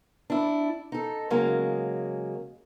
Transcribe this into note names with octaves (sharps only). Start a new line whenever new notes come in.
D4 E4
D#4 A4
C#3 F#3 G#3 A#3